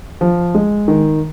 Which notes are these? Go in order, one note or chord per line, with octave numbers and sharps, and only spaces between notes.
F3
G#3
D#3